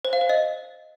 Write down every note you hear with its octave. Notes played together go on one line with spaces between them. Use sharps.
C5
F5
C5
D#5